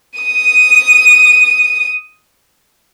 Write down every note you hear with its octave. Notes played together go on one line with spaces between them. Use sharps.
D#6 D#7